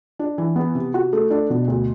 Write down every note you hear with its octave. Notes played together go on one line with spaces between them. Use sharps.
D4
E3
B3
C3
F#4
A3
D4
B2
D2